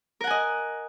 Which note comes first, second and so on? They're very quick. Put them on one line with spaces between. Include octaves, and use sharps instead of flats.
A#4 F#5 G#5 D#5